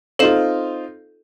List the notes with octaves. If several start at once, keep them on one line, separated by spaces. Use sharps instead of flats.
C4 D#4 F4 A4 F5 E7